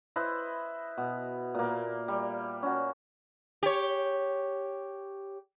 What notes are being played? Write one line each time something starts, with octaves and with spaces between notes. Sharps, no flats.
E4 B4 C5 D#5
B2
A#2 A#3
G3
C#4 F#4
G4 C#5